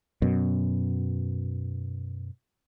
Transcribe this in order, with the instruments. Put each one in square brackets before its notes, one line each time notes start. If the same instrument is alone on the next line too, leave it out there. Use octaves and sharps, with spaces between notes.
[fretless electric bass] F#2 B2